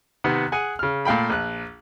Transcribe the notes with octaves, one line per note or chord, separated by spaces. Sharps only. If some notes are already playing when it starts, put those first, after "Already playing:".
C3 D#3 B3 F#5
G#4 F#5 G#5
C#3 F6
A#2 A3 F5 G5 B5
A#1 F#6